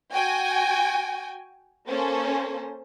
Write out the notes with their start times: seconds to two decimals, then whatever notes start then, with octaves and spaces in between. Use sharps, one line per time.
0.12 F#4 G5 G#5
1.88 A#3 C#4 A4 C5